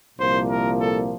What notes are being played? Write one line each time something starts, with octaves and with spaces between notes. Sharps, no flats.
C2 A#2 F3 A#3 C5
A#4
A4